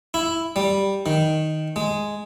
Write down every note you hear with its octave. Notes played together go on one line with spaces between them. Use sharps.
E4
G3
D#3
G#3